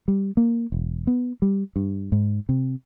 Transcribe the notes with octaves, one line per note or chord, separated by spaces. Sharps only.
G3
A#3
E1
B3
G3
G2
G#2
C3